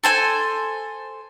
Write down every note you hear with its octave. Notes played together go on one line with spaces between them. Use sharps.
A4 C5 G#5